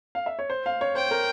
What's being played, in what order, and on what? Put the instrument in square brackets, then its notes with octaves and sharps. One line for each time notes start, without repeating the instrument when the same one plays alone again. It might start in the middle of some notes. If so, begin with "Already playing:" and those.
[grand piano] F5
E5
C#5
C5
F5
C#5
[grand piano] C5 [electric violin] G5
[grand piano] A#4